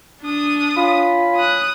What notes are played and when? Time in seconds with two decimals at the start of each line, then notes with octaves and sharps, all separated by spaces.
0.22 D4 D#6
0.77 F4 C#5 G#5 B5
1.36 D#6 F#6